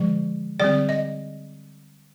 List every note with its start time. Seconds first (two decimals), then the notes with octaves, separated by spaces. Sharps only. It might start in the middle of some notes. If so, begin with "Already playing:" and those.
Already playing: D3 F3 G#3
0.60 D3 G3 C4 D5
0.89 D#5